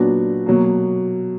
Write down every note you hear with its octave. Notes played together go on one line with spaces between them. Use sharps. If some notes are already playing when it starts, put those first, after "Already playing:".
Already playing: A#2 F#3 B3 D4 F#4
B2 F#3 A#3